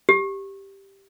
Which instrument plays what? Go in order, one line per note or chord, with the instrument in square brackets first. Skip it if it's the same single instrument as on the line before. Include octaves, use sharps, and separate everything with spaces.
[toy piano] G4